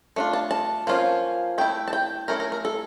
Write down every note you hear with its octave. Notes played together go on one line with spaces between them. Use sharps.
A3 D4 F4
A5
A5
F3 A#3 C#4 F4
A3 E4 G5
A5
G5
A3 C#4 E4 A#4
A#4
A#4
A4